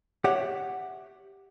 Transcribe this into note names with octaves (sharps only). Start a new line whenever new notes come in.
G4 C#5 E5 F#5